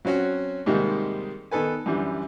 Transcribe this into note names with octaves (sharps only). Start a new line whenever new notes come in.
F#3 C4 C#4 F#4
G#2 C3 D#3 G3 A#3
D#3 B3 A4 B4 G#5
F#2 D3 E3 G3